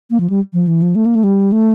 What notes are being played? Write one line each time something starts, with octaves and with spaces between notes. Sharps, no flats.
A#3
F3
G3
F3
E3
F3
A3
A#3
A3
G3
A3